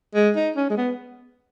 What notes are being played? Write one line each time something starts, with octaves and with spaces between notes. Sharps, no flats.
G#3
D#4
C#4
G#3
B3